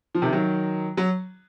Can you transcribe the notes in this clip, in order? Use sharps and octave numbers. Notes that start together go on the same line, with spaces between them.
F3
C3 D#3
D#3 F#3
F#3